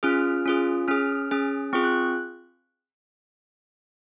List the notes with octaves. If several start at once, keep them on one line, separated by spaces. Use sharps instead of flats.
C#4 F4 G#4 F6
C#4 F4 G#4
C#4 G#4 F6
C#4 G#4
C4 F4 G#4 C#6
F#6